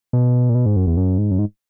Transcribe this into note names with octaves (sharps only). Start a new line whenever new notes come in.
B2
A#2
B2
G#2
F#2
E2
F#2
G#2
F#2
G#2